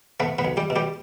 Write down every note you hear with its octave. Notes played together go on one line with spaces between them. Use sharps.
A3 B3 B4
B3 B4
B1
G3 G4
B2
G3 G4